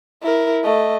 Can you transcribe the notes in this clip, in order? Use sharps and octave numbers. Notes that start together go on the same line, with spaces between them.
E4 A#4
A3 D#5